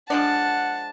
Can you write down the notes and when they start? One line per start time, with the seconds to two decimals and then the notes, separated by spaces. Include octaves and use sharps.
0.10 F3 G#3 D4 F#5 A5